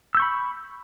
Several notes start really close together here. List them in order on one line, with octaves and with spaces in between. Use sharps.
E6 G6 C#6 B5